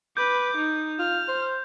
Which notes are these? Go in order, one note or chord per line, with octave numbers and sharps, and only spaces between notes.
B4 D6 G6
D#4
F4 F6
C5